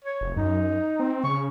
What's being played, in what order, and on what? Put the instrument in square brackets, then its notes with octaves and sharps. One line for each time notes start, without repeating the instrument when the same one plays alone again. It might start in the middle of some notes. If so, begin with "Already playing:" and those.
[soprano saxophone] C#5
[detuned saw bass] F1
[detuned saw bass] F#2 [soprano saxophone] D#4
[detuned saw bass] C4
[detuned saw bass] C#3 [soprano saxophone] C#6